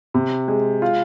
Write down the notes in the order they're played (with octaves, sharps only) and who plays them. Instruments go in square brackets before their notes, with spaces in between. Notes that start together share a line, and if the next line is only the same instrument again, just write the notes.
[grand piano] C3
G#3
F4